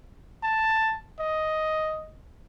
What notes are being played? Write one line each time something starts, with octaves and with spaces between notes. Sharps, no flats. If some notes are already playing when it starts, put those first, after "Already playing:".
A5
D#5